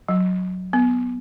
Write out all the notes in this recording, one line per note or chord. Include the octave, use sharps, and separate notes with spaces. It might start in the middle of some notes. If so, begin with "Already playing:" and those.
F#3
B3